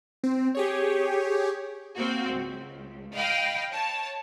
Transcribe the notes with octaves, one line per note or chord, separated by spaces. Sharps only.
C4
G4 G#4 C#5
A#3 C4 F#4
C#2
D#5 F5 G5 B5
C#5 A5